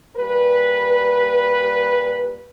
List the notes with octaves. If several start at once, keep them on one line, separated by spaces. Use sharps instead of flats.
A#2 G3 B4